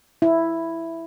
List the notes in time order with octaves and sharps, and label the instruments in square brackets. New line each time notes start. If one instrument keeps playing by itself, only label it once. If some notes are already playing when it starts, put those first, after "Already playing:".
[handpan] E4